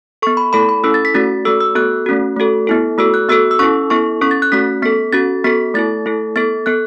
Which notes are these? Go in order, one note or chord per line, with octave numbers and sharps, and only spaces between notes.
B3 A4 C#6
B5
A3 E4 A4 B5
B5
C#4 E4 A4 E6
A6
B6
A3 C#4 F#4 A6
A3 F#4 A4 E6
E6
B3 F#4 A4 F#6
A3 C#4 F#4
A3 F#4 A4
B3 E4 A4
A3 F#4 A4 E6
F#6
B3 F#4 A4 E6
E6
C#4 E4 A4 C#6
B3 E4 A4 C#6
C#4 A4 C#6
A6
F#6
A3 C#4 F#4 B6
B3 A4 B6
C#4 F#4 A4 A6
B3 F#4 A4 B6
A3 E4 A4 A6
A3 E4 A4
B3 A4 A6
B3 A4 F#6